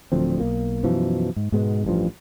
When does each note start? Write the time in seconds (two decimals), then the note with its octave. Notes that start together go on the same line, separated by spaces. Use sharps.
0.12 D1 D2 F3 C4
0.40 B1 A#3
0.83 F#2 B2 E3 F3
1.36 G#2
1.52 G#2 B2 G#3 B3
1.85 A1 G2 F3